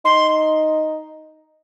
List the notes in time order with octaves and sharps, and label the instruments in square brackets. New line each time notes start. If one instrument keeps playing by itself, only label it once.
[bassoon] D#4 [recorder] C6